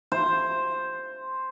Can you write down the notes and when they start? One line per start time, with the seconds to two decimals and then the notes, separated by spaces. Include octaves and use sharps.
0.12 C5